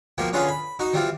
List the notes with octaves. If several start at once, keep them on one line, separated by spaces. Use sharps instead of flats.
B2 F3 A#3 G4
D3 C#4 F4 G#4 B4
B5
D#4 F#4
E3 G3 C4 F4